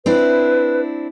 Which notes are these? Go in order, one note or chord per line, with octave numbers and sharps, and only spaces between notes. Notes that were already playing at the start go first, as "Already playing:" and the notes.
C4 D4 E4 B4